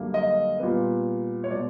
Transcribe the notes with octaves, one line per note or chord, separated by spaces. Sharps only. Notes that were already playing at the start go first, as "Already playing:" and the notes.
Already playing: F#2 D3 G3 A#3
D#5
A#2 G3 B3
C#5
B2 G#3 D5